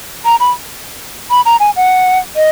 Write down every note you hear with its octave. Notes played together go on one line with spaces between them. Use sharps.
A#5
B5
B5
A#5
G#5
F#5
D#5